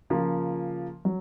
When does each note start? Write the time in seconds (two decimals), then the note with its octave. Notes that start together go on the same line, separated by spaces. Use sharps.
0.10 C#3 F3 A#3 F4
1.05 F#3